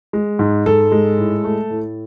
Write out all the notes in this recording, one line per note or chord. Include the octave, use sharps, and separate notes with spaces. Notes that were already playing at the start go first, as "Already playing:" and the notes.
G#3
G#2
G#2 A4
G#3
A2
A3
A2